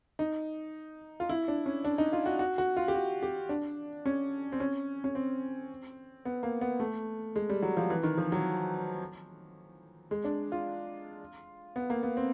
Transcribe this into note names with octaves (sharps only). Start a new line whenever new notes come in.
D#4
F4
E4
D4
C#4
D4
D#4
F4
F#4
F#4
F#4
F4
G4
F#4
G4
D4
C#4
C4
C#4
C#4
C4
B3
A#3
B3
A3
G#3
G3
F#3
F3
E3
D#3
F3
F#3
G#3
D4
F4
B3
A#3
B3
C4